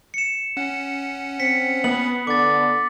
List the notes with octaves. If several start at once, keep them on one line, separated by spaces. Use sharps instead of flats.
C#7 E7
C#4 F#5
C4 B6 C#7
B3 F#7
D3 D6 A6